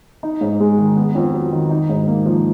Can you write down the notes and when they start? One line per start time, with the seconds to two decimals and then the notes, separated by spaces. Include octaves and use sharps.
0.23 D#4
0.41 G#2
0.60 G#3
0.78 D#3
0.96 B3
1.15 F2
1.33 F#3
1.52 D#3
1.71 D#4
1.89 G#2
2.08 A#3
2.26 F3